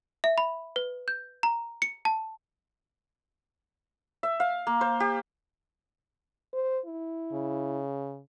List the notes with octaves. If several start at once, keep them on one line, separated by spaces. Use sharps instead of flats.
E5
B5
B4
G6
A#5
C#7
A5
E5
F5
A#3
C5
G4
C5
E4
C#3